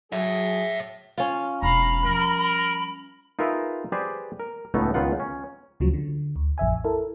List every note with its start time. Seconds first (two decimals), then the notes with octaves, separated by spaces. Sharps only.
0.12 F#3 G#4 C#5 E5
1.18 C#4 F4
1.62 E1 F5 A#5 B5
2.04 F3 G3 A#4
3.39 D#4 F4 G#4 A#4 B4 E5
3.92 G4 G#4 B4 C5 D5
4.40 A#4
4.74 C#2 A2 A3 B3 D#4
4.94 C#2 D#3 B3 F4 F#5
5.20 C#4
5.80 D2 C#3 F3 F#3
5.94 D3
6.36 D2
6.58 A1 F2 E5 G#5
6.84 E4 A4 A#4